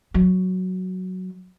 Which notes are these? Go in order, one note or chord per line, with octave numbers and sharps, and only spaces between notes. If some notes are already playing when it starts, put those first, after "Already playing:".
F#3